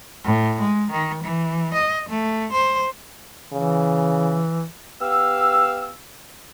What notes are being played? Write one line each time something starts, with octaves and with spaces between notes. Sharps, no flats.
A2
G#3
D#3
E3
D#5
A3
C5
C#3 E3
B3 G4 F5 E6